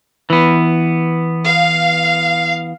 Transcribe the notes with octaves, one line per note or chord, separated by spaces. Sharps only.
E3 B3
F5